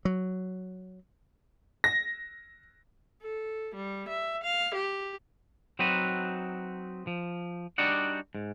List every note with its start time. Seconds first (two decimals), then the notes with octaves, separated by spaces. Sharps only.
0.05 F#3
1.84 A#6
3.22 A4
3.75 G3
4.09 E5
4.44 F5
4.75 G4
5.79 F#3 C4 D#4 F#4 B4
7.07 F3
7.78 G3 D4 D#4 F#4 D5 F#5
8.35 G#2